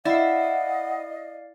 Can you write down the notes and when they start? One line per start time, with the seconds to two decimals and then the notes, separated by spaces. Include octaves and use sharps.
0.05 E4 D5 D#5 F5 F#5